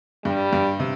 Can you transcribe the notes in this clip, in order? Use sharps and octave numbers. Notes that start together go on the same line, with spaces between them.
G2 G3
G2
C3